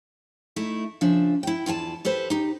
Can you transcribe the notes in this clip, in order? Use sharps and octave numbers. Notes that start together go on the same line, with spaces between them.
A3 D#4 E4
C#3 F3 D4 E5
E4 G5
E2 F4 D5 A5
G4 A4 B4 C5
D#4 G4